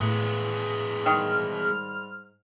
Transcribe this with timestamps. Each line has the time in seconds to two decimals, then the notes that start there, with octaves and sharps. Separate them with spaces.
0.01 A2 G#3 B3
1.06 G#2 D#3 G3 F6